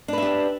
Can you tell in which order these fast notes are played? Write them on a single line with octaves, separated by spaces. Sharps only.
D4 B4 E5 G4